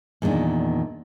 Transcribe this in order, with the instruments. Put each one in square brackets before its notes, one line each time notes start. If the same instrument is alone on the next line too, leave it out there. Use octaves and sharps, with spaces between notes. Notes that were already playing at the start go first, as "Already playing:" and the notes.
[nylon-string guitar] E2 A#2 D3 D#3 D4